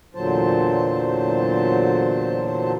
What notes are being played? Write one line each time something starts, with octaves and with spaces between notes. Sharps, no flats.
E2 A#2 D3 F#3 C5 A5